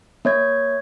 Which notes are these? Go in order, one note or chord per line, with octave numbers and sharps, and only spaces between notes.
A#3 C#5 G#6